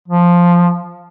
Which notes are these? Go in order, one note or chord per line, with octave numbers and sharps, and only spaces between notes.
F3